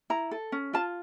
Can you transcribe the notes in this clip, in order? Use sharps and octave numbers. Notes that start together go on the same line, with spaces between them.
E4 A#5
A4
C#4
F4 A5